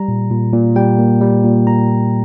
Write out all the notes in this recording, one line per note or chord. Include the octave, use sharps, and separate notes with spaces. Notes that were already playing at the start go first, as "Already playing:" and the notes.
Already playing: G3 A#5
A#2
A#2
A#2
G3 G5
A#3
G3
A#2
A#2 A#5
A#2